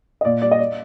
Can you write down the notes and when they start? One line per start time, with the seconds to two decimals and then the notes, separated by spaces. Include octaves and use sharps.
0.21 D#5
0.25 A#2 D5
0.42 G3 D5
0.51 D#5
0.59 D5